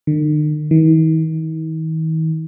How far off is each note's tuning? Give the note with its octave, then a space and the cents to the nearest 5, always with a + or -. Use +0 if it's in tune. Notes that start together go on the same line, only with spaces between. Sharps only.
D#3 -45
D#3 +45